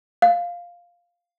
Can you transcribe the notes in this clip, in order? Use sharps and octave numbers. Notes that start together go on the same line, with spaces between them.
F5